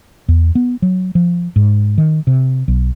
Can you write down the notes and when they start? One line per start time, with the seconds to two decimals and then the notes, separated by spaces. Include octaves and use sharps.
0.28 E2
0.55 B3
0.82 F#3
1.15 F3
1.56 G#2
1.98 D#3
2.27 C3
2.68 B1